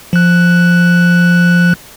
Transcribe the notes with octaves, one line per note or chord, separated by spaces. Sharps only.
F3 F#6